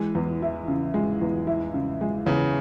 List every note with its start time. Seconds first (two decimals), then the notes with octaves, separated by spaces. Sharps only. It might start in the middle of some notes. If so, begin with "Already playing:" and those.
Already playing: E3 G#3
0.15 E2
0.42 E4
0.68 C#3
0.94 G#3
1.21 E2
1.47 E4
1.74 C#3
2.01 G#3
2.26 E2 C#3